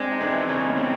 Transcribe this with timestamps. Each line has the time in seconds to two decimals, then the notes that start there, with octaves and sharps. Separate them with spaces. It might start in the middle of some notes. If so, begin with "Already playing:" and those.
Already playing: G#3 C4 D4
0.12 D#4
0.20 E3 C4 D4
0.49 C#3 C#4 D#4
0.68 B3 C#4
0.77 C4